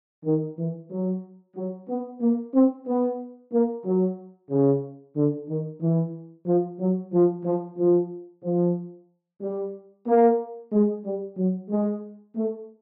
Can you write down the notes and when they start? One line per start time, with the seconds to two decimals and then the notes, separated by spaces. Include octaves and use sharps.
0.25 D#3
0.57 E3
0.90 F#3
1.56 F#3
1.88 B3
2.21 A#3
2.54 C4
2.87 B3
3.52 A#3
3.85 F#3
4.50 C#3
5.15 D3
5.48 D#3
5.81 E3
6.46 F3
6.79 F#3
7.12 F3
7.44 F3
7.77 F3
8.42 F3
9.41 G3
10.07 A#3
10.72 G#3
11.05 G3
11.37 F#3
11.70 G#3
12.35 A3